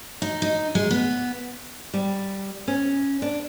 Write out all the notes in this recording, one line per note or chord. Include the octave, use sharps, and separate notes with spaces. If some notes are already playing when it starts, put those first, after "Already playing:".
D#4
D#4
G#3
B3
G3
C#4
D4